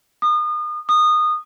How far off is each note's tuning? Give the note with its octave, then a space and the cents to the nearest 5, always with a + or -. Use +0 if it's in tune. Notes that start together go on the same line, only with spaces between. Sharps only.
D#6 -35
D#6 -20